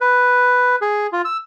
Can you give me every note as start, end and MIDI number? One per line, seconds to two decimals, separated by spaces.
0.01 0.76 71
0.81 1.07 68
1.13 1.22 65
1.25 1.37 88